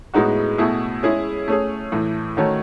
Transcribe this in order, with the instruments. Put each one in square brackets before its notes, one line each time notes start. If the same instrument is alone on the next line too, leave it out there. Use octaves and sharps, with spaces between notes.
[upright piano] A2 G#3 B3 D#4 F#4
B2 A3 E4 G#4
G#3 C#4 E4 G#4
A3 C#4 G#4
A2 E3 A3
D#3 A3 C#4 F#4 C#5